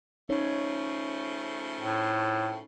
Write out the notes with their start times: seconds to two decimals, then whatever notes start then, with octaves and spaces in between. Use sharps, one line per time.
0.29 C#3 F3 A3 C#4 D#4 C#5
1.81 A2